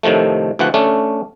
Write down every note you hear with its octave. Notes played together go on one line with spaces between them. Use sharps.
A2 C3 D#3 F3 A3
D2 E3 F3 F#5
A3 C#4 D4